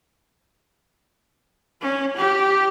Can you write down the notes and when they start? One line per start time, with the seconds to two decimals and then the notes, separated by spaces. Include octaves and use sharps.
1.81 C#4
2.17 G4